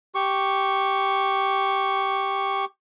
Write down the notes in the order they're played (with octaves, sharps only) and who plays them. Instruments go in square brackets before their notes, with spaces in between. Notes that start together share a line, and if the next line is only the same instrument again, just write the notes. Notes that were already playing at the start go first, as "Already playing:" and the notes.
[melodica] G4 C#6